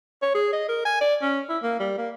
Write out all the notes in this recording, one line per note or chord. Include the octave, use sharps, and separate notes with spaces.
C#5
G#4
D#5
A#4
G#5
D5
C#4
E4
A#3
G3
A#3